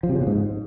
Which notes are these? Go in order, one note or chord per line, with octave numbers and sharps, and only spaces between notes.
F3
C3
C#3
B2
G#2